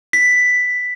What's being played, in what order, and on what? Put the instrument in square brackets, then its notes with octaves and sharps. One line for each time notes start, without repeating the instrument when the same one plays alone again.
[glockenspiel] B6